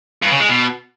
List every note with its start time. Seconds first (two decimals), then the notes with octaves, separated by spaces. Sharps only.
0.22 G2
0.31 C#3
0.40 G#3
0.49 B2